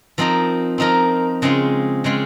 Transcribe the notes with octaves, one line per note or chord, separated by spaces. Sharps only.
F3 C4 D#4 A#4
F3 C4 D#4 A#4
C#3 G#3 C4 F4
C#3 G#3 C4 F4